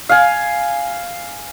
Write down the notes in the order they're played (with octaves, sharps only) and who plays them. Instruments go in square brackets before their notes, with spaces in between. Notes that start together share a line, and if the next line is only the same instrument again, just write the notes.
[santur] F5 G#5